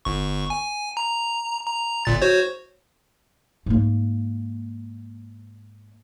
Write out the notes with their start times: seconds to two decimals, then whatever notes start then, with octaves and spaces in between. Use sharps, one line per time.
0.05 G1 C#6
0.50 G#5
0.97 A#5
1.66 A#5
2.05 G1 A#2 A6
2.22 F#4 C5 C#5
3.66 G#2 A#3